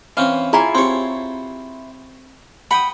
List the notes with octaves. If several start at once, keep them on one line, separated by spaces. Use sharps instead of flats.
E3 C4 C#4 F5
E4 F4 G#4 G#5 A#5
C4 G4 C#5 C6
F#5 G5 B5 D#6